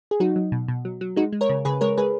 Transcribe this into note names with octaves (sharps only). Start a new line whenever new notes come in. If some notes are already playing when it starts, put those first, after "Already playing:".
G#4
F#3 D#4 F#4
F#3
B2
B2
F#3
F#3
G#3 D#4 F#4
G#3
A#4 C#5
C#3
C#3 G#4 B4
G#3 A#4 C#5
G#3 G#4 B4